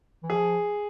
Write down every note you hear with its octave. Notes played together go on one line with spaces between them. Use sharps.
E3
F3 G#4